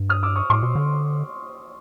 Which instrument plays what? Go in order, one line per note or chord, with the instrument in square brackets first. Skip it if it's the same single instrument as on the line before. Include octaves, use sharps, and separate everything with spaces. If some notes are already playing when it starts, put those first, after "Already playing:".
Already playing: [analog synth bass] G2
[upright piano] D#6 F6
D6 E6
C#6 D#6
[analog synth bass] A2 [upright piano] C6 D6
[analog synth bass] B2
D3